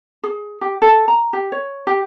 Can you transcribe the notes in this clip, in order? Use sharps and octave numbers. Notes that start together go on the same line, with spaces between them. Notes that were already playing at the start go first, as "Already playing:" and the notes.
G#4
G4
A4
A#5
G4
C#5
G4